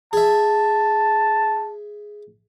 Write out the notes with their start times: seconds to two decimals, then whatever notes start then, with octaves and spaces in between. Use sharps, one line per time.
0.13 G#4 E5 A5